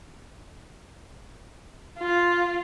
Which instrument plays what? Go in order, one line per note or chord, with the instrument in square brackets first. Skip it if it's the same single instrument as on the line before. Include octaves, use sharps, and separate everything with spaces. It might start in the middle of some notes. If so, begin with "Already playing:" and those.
[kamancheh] F4